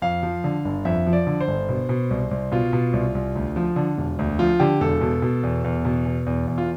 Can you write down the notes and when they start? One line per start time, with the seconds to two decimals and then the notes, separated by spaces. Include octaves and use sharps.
0.02 F2 F5
0.23 F3
0.44 D3
0.65 G1
0.85 F2 E5
1.06 F3
1.13 D5
1.27 D3
1.41 C5
1.48 G1
1.69 B2
1.89 B2
2.10 C2
2.31 C2
2.52 B2 F4
2.73 B2
2.93 C2
3.15 C2
3.35 D2
3.56 F3
3.76 D3
3.98 E1
4.19 D2
4.39 F3 F4
4.60 D3 G4
4.81 E1 A4
5.01 B2
5.22 B2
5.43 E2
5.64 E2
5.85 B2
6.06 B2
6.26 E2
6.48 E2
6.58 F4